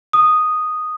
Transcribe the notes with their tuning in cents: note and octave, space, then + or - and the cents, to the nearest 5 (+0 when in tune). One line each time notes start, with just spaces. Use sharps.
D#6 -5